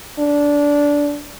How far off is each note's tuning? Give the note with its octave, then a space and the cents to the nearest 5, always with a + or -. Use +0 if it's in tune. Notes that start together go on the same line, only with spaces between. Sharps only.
D4 -15